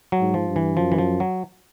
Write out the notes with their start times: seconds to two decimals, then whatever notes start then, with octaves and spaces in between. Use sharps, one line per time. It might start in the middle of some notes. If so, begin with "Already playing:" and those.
0.12 F#3
0.19 G#2
0.34 F3
0.48 G2
0.56 E3
0.77 F#2 F3
0.92 E3
0.98 F3
1.20 F#3